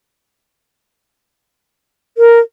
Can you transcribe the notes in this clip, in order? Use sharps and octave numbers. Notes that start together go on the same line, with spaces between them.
A#4